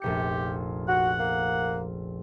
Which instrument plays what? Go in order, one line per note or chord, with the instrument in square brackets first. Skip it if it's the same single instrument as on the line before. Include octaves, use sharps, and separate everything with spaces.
[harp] F1 A#1 C#7 [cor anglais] G4
[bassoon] F#4 [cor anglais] F#5
[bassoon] A#3